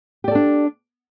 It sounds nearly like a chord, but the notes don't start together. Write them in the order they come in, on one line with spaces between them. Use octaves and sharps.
G4 D5 A4 D4